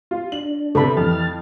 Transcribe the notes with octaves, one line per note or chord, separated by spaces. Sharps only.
F4
D4 F#7
C3 B3 A4 B5
F2 E3 F6 A6